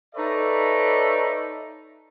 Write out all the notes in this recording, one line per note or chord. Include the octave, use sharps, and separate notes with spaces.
D#4 A4 B4 C#5 D5 E5